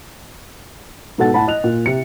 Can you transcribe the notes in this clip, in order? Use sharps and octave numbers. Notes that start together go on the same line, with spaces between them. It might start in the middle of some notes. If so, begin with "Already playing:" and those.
G#2 B2 A4 F#5 A6
A2 F#5 A5 B5
D#5 F#6 F7
A#2
C3 C#7